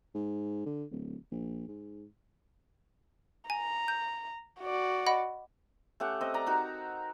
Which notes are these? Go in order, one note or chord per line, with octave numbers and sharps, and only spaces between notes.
G#2
D3
D1
A#1
G#2
G#5 A#5
G6
F#4 D5
D#5 F#5 B5
A3 C#4 G4 F#5
C4 D#5
D5 A#5
D#4 F#4 A#4